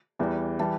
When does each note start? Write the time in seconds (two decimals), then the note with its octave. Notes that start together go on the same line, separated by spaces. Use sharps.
0.19 E2 E3 G3
0.59 E3 G3 A5